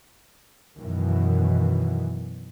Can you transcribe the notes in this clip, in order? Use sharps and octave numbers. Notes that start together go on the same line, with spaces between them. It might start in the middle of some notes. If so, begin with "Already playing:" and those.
F#2 B2 D#3 E3